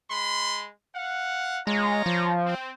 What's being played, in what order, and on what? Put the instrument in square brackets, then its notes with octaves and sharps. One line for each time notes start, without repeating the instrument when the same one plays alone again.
[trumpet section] G#3 B5 C6
F5 F#5
[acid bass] G#3 [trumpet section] F4 C#5 A#5
[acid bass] F3
[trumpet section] C4